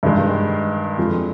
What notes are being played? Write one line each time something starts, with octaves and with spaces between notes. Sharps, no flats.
G2 D#3 G#3 D#4
F2 D3 F3 G#3